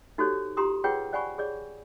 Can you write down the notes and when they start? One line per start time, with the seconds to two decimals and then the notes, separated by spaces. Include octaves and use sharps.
0.18 D#4 F#4 G4 A4 C5 C#5
0.57 F4 G4 A#5 C6 D#6
0.84 F4 G#4 B4 C#5 F#5 G5
1.13 C5 D5 F#5 G#5 B5 C#6
1.38 G#4 C#5 D5